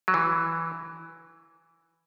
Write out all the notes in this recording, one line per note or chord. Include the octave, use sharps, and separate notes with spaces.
F#3
E3